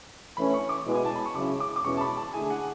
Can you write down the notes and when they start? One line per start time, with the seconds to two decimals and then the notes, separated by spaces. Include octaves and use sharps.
0.37 E3 A3 C#4 B5
0.54 C#6
0.69 D6
0.86 B2 G#3 B3 E4
0.95 G#5
1.05 A5
1.15 B5
1.25 C#6
1.35 C#3 F#3 C#4 E4 G#4 D6
1.60 D6
1.76 D6
1.84 E2 B2 G#3 C#4 E4 C#6
1.97 A5
2.01 B5
2.17 A5
2.33 D3 A3 E4 G#4 G#5
2.50 F#5